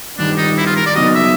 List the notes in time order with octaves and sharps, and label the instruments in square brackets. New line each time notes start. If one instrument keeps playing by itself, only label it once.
[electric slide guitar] G2 D#3 G3 [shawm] D4
[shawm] D#4
E4
F4
A#4
D5
[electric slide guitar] C#3 F#3 B3 D#4 F#4 [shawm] D#5
[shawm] E5